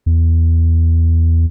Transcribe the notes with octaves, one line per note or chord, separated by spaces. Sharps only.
E2